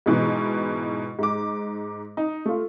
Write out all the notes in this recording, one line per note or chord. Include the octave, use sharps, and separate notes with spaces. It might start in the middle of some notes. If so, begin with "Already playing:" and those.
G#2 B2 E3
G#2 D6
D#4
A3 F4